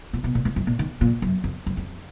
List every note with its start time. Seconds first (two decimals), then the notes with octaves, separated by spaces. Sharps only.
0.13 A#2
0.24 B2
0.35 A#2
0.45 G#2
0.56 F#2
0.67 A#2
0.79 D#3
1.01 A#2
1.22 F#2
1.44 F2
1.66 F#2
1.77 F2